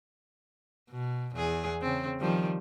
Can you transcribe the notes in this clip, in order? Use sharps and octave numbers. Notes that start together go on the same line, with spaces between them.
B2
E2 G#4
C#3 C4
D#3 F3 G3